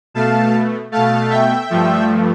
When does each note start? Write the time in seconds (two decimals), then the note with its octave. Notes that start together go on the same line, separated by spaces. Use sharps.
0.14 B2 A3 F5 A5
0.92 B2 A3 F5 A5
1.30 E5 G5
1.70 G2 F3 A3